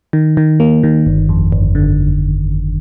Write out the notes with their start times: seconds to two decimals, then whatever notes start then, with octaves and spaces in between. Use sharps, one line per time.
0.13 D#3
0.37 D#3
0.60 A#3
0.83 D#3
1.06 G1
1.29 F2
1.52 G1
1.75 D3